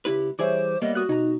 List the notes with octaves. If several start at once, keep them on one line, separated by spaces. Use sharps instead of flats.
C#2 E4 G4 B4
E3 G3 G#4 C5 C#5 E5 D6
G3 A#3 B3 D#5
F#4 D#6 F#6
B2 D#4 A#5